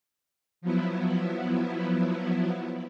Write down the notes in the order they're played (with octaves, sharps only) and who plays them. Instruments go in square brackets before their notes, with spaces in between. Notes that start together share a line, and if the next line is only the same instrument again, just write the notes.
[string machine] F3 F#3 B3 E4